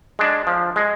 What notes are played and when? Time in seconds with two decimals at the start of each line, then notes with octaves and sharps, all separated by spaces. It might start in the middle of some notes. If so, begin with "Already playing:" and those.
0.19 G#3 D4
0.47 F3
0.76 G#3